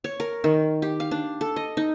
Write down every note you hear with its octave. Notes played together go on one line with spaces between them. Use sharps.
C#5
A#4
D#3
G4
F5
D4
A4
D#5
D#4